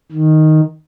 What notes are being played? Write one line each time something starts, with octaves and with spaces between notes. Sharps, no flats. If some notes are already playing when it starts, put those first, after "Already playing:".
D#3